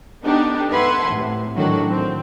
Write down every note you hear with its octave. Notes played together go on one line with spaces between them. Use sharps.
B3 D4 D#4 G4 A4
B4 E5 F#5 A5 C6 G#6
A2 C3
A2 D#3 F#3 D4 F#4 A4
C4